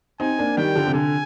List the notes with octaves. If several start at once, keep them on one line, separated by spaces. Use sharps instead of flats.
C4 D#4 G#5
A#3 D4
D#3 G3 G5
D3 F3
C3
D3 G#5